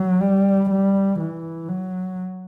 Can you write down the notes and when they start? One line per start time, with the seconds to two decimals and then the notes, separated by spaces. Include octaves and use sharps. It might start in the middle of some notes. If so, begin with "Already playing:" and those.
Already playing: F#3
0.21 G3
0.70 G3
1.20 E3
1.69 F#3